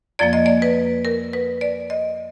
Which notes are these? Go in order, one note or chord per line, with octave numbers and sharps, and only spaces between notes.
F2 F3 A#3 D5
D#5
D5
B4
A#4
B4
D5
D#5